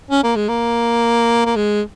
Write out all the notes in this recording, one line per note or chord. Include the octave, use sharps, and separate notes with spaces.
C#4
A#3
G#3
A#3
A#3
G#3